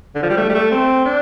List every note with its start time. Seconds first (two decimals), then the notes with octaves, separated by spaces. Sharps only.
0.15 D3
0.23 F3
0.30 G3
0.37 A3
0.49 G3
0.55 A3
0.71 C4
1.05 D4